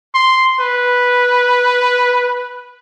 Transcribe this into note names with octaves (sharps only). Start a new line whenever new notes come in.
C6
B4